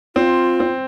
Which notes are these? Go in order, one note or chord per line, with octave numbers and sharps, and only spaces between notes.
C4 F4
C4